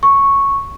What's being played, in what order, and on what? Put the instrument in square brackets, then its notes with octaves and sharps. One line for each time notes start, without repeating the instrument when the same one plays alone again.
[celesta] C#6